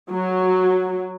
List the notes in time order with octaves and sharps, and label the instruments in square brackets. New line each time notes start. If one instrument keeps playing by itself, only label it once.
[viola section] F#3